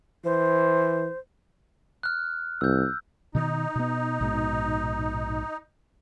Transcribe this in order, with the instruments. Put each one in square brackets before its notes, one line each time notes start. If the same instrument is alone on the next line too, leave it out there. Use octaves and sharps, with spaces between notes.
[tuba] E3 [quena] C5
[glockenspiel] F6 F#6
[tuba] C2 [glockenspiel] E6 G6
[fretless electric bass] B2 D#3 [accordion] D#4
[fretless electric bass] B2 B3
A#1 G#2 B2